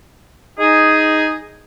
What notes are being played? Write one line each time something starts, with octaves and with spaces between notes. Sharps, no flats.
D#4 G#4